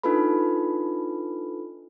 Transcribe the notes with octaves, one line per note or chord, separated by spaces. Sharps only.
D4 D#4 F4 A4 B4 B5